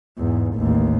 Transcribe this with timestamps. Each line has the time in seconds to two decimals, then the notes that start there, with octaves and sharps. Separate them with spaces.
0.18 E2 G#2
0.55 A1 D#2